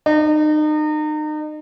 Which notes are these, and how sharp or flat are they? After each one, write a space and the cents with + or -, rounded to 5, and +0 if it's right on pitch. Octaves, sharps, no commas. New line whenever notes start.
D#4 -35